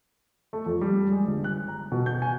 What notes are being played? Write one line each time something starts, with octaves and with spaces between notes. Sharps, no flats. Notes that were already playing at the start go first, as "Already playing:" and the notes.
A3
F2
G3
G#3
G1
F#6
A#5
B2
G6
G#5